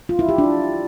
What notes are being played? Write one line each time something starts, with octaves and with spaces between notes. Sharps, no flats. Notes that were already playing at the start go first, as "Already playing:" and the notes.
F4
E4
G4
D4